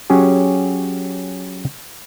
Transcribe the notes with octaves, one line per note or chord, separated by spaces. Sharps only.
F#3 C#4 G4 G#4